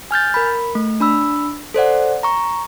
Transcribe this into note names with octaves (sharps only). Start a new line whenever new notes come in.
G#5 F6 G6 A6
A#4 B5
A3
D4 B5 E6
A4 C5 D5 F#5
A#5 C#6